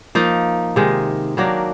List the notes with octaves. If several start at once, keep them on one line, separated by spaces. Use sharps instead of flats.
F3 A#3 D#4
C3 D#3 G#3
D#3 F#3 A#3 D4